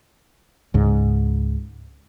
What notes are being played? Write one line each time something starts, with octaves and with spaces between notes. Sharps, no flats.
C#2 G#2